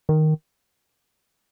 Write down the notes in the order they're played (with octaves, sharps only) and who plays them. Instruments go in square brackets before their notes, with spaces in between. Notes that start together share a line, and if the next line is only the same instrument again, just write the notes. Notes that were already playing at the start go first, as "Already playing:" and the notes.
[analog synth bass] D#3